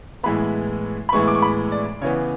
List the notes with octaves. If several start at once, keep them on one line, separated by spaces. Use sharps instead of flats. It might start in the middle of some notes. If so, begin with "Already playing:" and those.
A2 E3 G#3 B3 B5
B5
A2 E3 G#3 B3 C#6
D6
C#6
B5
D5
C#3 E3 B3 C#5